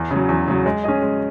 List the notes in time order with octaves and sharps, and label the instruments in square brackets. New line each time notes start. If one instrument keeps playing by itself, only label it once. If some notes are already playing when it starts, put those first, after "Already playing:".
Already playing: [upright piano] E2
C#3
F#3
E2
C#3 F#3
G#3
C#4 G#4 D#5
G#3